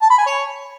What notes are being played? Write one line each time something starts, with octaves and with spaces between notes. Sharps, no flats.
A5
B5
G#5
C#5